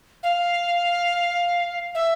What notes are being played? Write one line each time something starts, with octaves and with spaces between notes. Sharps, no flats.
F5
E5